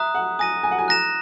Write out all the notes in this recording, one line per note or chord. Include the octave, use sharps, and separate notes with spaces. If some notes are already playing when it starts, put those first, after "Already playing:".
Already playing: E5 A#5 D#6 F#6
F#5
G#5 D#6 A#6 D#7
G#5
F#5
G#5
A#5 F#6 A#6 E7